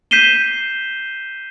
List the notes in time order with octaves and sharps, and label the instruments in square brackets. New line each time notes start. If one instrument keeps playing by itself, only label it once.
[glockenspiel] G6 B6 C7 D#7 E7 G7